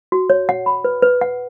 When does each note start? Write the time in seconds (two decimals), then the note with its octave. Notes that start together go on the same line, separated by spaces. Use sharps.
0.12 F#4
0.30 C#5
0.49 F#5
0.66 B5
0.84 B4
1.02 B4
1.21 F#5